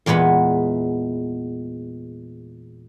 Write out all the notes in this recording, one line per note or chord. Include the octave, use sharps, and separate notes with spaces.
E2 A#2 G#3 B3 B5